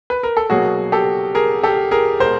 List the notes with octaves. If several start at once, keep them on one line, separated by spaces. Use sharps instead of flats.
B4
A#4
A4
B2 F#3 A#3 F#4 G#4
G4 A4
G#4 A#4
G4 A4
G#4 A#4
B2 G#3 A#4 C5